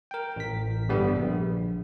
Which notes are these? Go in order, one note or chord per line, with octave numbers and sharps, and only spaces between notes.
A#4 G5
A1 B6
G1 D3 G3 B3
A#1